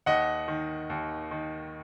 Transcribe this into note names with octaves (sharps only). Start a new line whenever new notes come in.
D#2 D#5 F#5
D#3
D#2
D#3